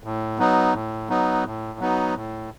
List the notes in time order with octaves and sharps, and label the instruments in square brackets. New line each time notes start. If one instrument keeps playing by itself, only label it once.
[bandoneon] A2
F#3 B3 D#4
A2
F#3 B3 D#4
A2
F#3 B3 D#4
A2